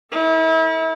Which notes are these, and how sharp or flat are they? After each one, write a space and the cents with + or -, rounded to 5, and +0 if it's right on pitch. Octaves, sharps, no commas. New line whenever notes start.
E4 -35 A4 +35